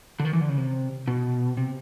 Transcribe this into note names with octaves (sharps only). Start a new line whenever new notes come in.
D3
D#3
E3
D3
C#3
C3
B2
C3